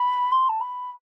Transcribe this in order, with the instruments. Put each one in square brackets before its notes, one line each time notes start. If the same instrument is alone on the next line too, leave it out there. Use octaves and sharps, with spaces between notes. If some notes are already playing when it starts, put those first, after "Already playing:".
Already playing: [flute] B5
C6
A5
B5